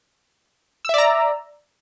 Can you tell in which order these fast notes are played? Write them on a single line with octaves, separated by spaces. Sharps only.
E6 E5 D5 A#5